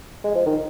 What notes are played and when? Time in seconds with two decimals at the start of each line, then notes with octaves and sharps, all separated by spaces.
0.24 G#3
0.35 F3
0.46 D#3